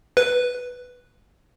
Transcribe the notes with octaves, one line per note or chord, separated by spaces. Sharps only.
B4